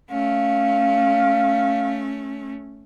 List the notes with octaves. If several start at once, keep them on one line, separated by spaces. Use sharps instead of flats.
A3 C#4 F5